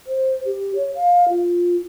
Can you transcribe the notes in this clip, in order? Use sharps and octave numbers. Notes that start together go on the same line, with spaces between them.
C5
G4
C#5
F5
F4